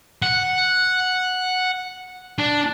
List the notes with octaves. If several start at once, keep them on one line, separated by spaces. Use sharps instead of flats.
F#5
D4